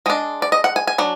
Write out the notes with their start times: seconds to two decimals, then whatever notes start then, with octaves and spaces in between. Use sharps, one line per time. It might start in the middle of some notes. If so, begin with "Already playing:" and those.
0.06 G#3 D4 D#5
0.42 D5
0.52 D#5
0.64 F#5
0.76 G#5
0.87 G#5
0.98 F#3 D4